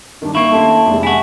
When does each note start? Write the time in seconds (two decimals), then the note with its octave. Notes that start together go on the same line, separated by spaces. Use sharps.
0.22 G2 D#3 D4
0.35 A#3 E4 C#6
0.52 A3 C#4 A5 C6
0.87 F1 G#3
1.03 E4 F#4 G#5